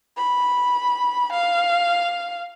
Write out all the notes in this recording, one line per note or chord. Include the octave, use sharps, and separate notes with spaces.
B5
F5